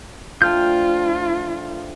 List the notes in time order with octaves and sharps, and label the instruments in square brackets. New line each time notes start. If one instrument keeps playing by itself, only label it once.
[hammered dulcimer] F3 A3 D4 [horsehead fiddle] F4 [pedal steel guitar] G5 F6 G6